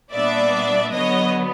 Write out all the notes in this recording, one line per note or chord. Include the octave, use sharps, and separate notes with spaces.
A#2 G3 B3 D4 D5 E5
D3 F#3 B3 C#5 D#5